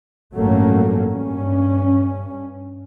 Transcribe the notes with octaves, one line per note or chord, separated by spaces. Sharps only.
A1 G2 F#3 A3 A#3 C#4
G2 C#4